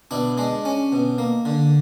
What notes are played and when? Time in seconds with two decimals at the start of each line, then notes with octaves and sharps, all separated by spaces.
0.11 B2 D4 E4
0.38 G#3 D4
0.65 C#4
0.92 B2
1.18 A#3
1.45 D3